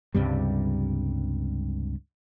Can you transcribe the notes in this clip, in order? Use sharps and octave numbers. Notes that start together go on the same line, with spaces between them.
C#2 G2 C3 G3